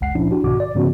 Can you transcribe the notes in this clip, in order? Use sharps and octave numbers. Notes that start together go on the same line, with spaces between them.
G1 C#2 F#5 C7
A#2 F3 C#4 D4 E4
D4 F#4 G4
C2 G#2 B2 D#3 F#4 D6
D5
G#2 C#3 F3 B3 C#4 F#4